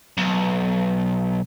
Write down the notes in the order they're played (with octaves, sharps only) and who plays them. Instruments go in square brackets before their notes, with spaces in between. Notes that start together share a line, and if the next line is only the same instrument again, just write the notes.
[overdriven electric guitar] B1